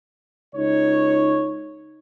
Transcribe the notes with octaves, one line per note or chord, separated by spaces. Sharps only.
C#2 D#4 C#5